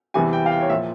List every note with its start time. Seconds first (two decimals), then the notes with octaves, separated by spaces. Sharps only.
0.14 E2 C3 E3 G3 G#5
0.33 G5
0.46 F5
0.52 G5
0.61 C#5
0.70 A#2 F3 E5